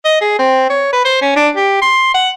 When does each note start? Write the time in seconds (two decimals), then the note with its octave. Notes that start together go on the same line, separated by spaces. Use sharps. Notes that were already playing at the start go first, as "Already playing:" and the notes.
0.05 D#5
0.21 G#4
0.39 C4
0.70 C#5
0.93 B4
1.05 C5
1.22 C#4
1.36 D4
1.56 G4
1.82 C6
2.15 F#5